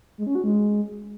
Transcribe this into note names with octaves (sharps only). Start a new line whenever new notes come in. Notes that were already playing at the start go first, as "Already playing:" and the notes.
G#3
C#4
F#4
G#3